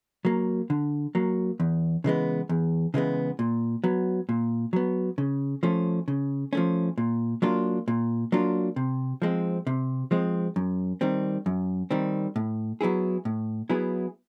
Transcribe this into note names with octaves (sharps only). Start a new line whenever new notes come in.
F#3 A#3
D3
F#3 A#3
E2
C#3 E3 G#3 B3
E2
C#3 E3 G#3 B3
A#2
F#3 B3
A#2
F#3 B3
C#3
F3 A3 C#4
C#3
F3 A3 C#4
A#2
F#3 A#3 D4 F4
A#2
F#3 A#3 D4 F4
C3
F3 G#3 C4
C3
F3 G#3 C4
F#2
D#3 G3 C4
F#2
D#3 G3 C4
A2
F#3 B3 E4 G#4
A2
F#3 B3 E4 G#4